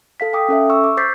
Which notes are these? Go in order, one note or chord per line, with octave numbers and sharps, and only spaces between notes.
A4 F5 B6
F5 G5 D6 D#6
C#4 A4 E5
C#6 E6
D6
C5 D6 G6 A6 B6 C7